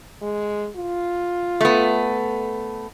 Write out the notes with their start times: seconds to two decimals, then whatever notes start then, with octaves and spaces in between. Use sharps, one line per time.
0.22 G#3
0.76 F4
1.61 A3 B3